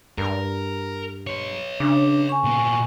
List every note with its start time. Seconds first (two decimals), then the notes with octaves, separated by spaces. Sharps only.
0.18 G2 A#4
1.27 B4 C#5
1.80 C#3 D4
2.29 G#5 C#6
2.44 A#2 B3